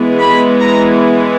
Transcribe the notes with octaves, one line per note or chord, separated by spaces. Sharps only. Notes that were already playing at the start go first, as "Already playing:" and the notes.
Already playing: E3 G#3 B3
B5
A#5